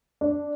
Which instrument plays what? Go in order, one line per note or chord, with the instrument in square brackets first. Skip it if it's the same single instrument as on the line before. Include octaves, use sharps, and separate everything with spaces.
[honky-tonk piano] D4